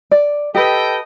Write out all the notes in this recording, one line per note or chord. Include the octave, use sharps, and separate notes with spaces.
D5
G4 A4 B4 D#5 G5